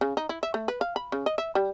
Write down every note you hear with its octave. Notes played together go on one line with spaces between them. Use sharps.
C#3
D#4
E4
E5
A3
B4
F5
B5
C#3
D#5
E5
G3